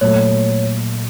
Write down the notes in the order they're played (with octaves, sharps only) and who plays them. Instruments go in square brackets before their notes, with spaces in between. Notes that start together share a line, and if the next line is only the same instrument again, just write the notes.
[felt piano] A#2 F#3 A3 [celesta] C#5